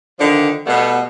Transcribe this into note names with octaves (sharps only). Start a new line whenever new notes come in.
D3 D#3 F3 D4
B2 G3 A3 B3